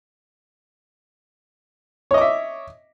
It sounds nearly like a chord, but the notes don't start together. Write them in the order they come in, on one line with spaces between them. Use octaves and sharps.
C#5 D#5 D6 E5